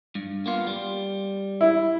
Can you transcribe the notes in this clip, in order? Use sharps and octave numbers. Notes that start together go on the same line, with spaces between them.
G2
A#3 B3 F4
G3
E4